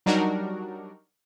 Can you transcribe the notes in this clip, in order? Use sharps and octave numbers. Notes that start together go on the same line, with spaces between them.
F#3 G3 D4 D#4 F#4 A#4